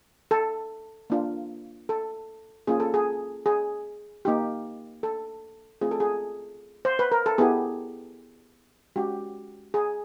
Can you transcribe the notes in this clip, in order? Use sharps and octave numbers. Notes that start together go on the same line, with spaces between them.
A4
A#3 D4 F4
A4
A#3 C#4 F4 G#4
A4
G#4
G#4
A#3 D#4 G4
A4
A3 C4 F4 G#4
A4
G#4
C5
B4
A#4
A4
B3 E4 G4 G#4
G#3 C#4 F#4 G4
G#4